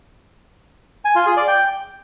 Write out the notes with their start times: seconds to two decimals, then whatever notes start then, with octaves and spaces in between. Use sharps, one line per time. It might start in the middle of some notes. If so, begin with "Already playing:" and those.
1.05 G#5
1.16 F4
1.26 G#4
1.37 D5
1.48 G5